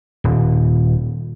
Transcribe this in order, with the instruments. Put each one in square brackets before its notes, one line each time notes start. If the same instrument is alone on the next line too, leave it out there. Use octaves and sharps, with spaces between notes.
[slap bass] D#1